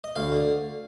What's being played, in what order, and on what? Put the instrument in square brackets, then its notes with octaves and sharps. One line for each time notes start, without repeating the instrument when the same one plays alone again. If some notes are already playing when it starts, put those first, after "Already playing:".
[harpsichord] D#5
D2 F5
D3